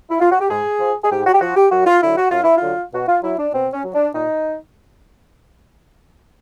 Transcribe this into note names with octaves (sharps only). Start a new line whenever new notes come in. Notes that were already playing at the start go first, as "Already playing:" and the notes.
E4
F4
F#4
G4
G#2 G#4
F3
G#4
G#2 G4
F#4
G4
F3 F#4
G4
F#2 F#4
F4
D3 F#3 E4
F#4
F#2 F4
E4
F4
D3 F#3
B2 F#4
F4
F#3 E4
D4
B2 C4
C#4
F#3
D4
A#2 D#4